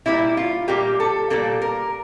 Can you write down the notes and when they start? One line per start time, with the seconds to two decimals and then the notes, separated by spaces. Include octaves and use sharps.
0.06 A#2 G3 A#3 E4
0.37 F4
0.68 A#2 G3 A#3 G4
1.00 A4
1.30 A#2 G3 A#3 A4
1.62 A#4